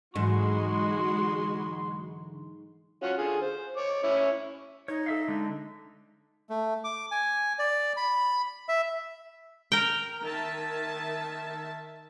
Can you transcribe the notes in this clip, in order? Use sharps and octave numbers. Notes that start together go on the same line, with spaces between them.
G#2 D3 E3 F#3 G#3 F#4 C6
C#4 F4 F#4
D3 F4 G#4
C5
C#5 D6
C#4 E4 C#5
D#4 C#5
A4 E5 F5
D3 G#3
A3
D6
G#5
D5
B5
E5
A#4 G5
D#3 E5 A5